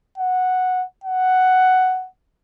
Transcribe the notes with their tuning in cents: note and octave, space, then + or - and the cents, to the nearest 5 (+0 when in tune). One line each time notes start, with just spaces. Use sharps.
F#5 -5
F#5 +5